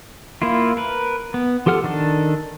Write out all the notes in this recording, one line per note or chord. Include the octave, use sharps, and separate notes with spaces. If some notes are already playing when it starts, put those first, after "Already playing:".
A#3 E4 F4
A#4 B4
B3
F3 G4 A4 F#5 F6
D#3 D4 A4